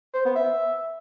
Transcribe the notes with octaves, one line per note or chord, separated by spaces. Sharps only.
C5
B3
E5